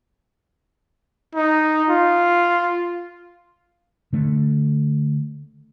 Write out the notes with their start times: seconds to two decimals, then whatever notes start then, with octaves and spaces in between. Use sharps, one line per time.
1.35 D#4
1.89 F4
4.13 D3 A3